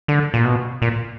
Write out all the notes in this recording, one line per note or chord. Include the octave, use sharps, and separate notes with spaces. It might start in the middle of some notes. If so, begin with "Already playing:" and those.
D3
A#2
B2
A#2